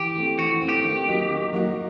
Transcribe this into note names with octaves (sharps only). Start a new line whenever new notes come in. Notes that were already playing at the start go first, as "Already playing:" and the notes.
Already playing: E3 G4
A3 C4
E3 F#4
A3 C4
G4
D#3
F#3 A#3 D#4 F#4
D#3
F#3 A#3 D#4 F#4